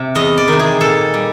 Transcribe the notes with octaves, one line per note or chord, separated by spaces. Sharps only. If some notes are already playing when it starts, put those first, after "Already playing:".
Already playing: C3
E2 D#5
D5
C3 D#3
G#4
A#2 A4
G3